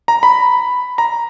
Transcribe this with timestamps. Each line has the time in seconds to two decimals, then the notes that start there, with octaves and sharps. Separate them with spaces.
0.08 A#5
0.23 B5
0.98 A#5